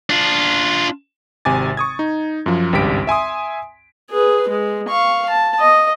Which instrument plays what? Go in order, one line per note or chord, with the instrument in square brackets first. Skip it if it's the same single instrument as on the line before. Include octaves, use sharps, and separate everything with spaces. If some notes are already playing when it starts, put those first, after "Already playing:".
[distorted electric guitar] D4 F4
[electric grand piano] G#1 C3 G#5 D6 A6
C#6 D#6 G#6
D#4
F#2 F3
G#1 C#2 G2 G4 B6 D7
E5 G#5 C6 D#6
[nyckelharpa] G#4 B4
G#3
F5 C#6
A5
D#5